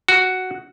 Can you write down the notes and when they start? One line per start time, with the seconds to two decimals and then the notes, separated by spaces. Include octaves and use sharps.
0.08 F#4